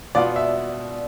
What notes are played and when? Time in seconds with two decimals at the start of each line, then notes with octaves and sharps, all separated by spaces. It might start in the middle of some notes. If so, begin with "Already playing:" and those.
0.15 B2 B3 F4 D5
0.36 E5